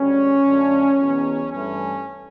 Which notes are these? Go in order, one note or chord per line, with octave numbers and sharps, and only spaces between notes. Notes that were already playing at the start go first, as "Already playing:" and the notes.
Already playing: D2 C#3 G3 C#4
F#2 D3 A3
E2 B2 F#3
G2 E3 A3 C#4